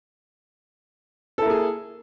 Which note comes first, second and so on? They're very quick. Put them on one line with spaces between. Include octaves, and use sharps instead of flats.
A4 E4 A#3 G#4